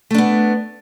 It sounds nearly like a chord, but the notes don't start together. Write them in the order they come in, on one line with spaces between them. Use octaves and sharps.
A3 D4 B3